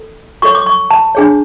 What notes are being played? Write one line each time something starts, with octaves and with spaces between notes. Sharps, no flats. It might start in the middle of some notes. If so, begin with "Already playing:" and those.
Already playing: A4
F#4 A4 C#5 C#6
D6
C#6
A5
D4 G#4 C#5